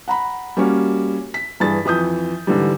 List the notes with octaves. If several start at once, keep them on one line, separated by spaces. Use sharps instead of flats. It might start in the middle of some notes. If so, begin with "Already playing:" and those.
F#5 A#5 B5
G3 A#3 C#4 F#4
B6
G2 E3 G#4 A6
F2 E3 D#6 G6
G#2 D3 E3 G3